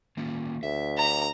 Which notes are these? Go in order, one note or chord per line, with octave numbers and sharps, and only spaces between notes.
D#3 A#3 C#4
D2 E5
A#5